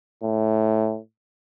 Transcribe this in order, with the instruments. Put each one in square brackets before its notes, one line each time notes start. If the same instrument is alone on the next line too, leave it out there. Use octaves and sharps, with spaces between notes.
[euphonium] A2